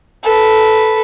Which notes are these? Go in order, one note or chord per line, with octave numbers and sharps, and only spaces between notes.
A4 B4